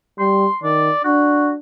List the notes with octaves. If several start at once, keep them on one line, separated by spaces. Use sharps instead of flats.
G3 C6
D#3 D5
D4 F#4